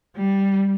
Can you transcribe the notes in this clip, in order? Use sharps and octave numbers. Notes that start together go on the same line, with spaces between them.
G3